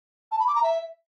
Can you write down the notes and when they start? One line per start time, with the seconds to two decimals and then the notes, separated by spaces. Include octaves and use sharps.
0.32 A5
0.40 B5
0.47 D6
0.55 A#5
0.63 E5